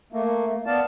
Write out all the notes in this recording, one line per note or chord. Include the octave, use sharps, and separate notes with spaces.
A3 A#3
B3 D5 F5 A5